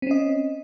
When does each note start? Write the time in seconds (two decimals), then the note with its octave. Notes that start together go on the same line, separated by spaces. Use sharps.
0.02 C4
0.07 C#4
0.11 D#5